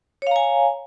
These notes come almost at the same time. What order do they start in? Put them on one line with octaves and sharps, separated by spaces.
C#5 F5 A#5 G#5